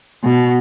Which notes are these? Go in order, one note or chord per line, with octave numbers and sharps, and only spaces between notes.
B2